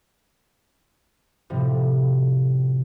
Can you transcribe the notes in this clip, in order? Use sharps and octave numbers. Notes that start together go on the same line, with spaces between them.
A2 C3 F3 G3